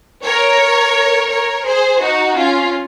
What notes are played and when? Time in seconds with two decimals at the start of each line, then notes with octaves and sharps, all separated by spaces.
0.25 A#4 C#5
1.30 A#4 C#5
1.66 G#4 C5
2.01 D#4 F#4
2.36 C#4 F4